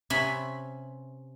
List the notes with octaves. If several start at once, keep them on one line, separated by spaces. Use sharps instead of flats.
C3 C#4 B4 E5 G#5 B5